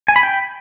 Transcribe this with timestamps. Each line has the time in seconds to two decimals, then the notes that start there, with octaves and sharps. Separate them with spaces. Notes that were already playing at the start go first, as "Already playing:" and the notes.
0.08 G#5
0.16 B5
0.23 G5